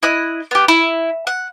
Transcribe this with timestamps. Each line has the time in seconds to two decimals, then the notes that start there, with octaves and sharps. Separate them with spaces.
0.03 E4 D#5 F#6
0.51 B3 G4
0.68 E4
1.27 F#5